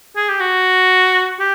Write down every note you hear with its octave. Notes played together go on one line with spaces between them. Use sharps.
G#4
G4
F#4
G4